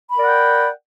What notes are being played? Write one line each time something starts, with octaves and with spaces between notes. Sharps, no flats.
A#4 D5 F#5 G5 B5